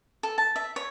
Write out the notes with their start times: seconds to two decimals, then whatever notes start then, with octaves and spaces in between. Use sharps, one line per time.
0.23 A4
0.38 A5
0.56 E5
0.76 C#5